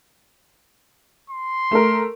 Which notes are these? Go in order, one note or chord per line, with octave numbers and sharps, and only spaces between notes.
C6
A3 A#4